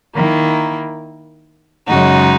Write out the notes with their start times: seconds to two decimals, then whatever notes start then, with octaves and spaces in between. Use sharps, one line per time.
0.14 D#3 A#3 E4
1.87 F#2 C#3 G#3 D#4 F#4